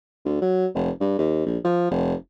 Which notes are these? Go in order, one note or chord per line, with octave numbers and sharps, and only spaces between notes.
D2
F#3
F1
G2
D#2
A#1
F3
F1